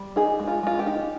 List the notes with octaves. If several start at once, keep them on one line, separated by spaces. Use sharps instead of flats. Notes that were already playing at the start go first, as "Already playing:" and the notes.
Already playing: G3
D#4 G#4
G#3
F4
G#3 F4
G4
D#4